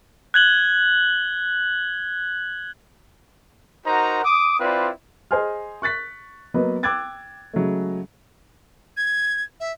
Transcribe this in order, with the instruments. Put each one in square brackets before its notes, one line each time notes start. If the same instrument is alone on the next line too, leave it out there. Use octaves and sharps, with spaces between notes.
[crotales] F#6 G#6 F#7 G7
[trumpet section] D#4 F#4 A#4 C5 F#5 A#5
D6 D#6
C4 E4 F4 B4 D5
[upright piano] G#4 C5 D#5 G#5 C6 F6
C#6 F#6 A6 B6
F#3 A#3 B3 B4 D#5
G5 D6 E6 F#6 G#6 A6
C#3 F#3 G#3 A3
[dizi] G#6
E5